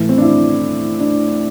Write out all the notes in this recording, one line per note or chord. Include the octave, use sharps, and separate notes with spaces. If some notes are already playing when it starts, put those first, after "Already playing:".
Already playing: A2 E3 E4
C4
D4
E4
D4